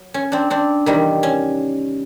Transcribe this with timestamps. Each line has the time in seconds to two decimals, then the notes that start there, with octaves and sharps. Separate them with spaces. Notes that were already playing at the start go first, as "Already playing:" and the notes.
Already playing: F#3
0.14 C#4
0.32 C4 D4
0.50 C4 D4
0.86 E2 C3 D#3 G3
1.23 C#4